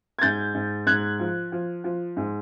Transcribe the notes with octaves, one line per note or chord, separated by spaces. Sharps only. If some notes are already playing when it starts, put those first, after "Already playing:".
G#6
G#2 G6 A6
G#2
G#2 F#6 G#6
F3
F3
F3
G#2